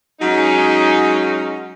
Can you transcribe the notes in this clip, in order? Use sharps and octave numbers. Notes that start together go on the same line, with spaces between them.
F#3 G#3 C#4 D#4